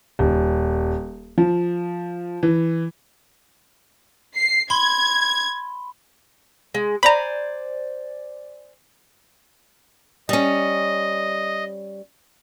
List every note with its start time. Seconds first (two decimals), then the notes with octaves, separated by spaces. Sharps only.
0.19 D#1
1.38 F3
2.43 E3
4.35 C7
4.70 B5 C6 G#6 G7
6.75 G#3
7.03 C5 D5 G#5 A#5 B5
10.29 G3 C#4 D#5